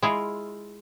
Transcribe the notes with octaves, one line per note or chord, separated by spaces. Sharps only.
G#3 E4 F4